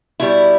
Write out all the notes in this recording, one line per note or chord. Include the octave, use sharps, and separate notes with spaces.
B2 G3 E4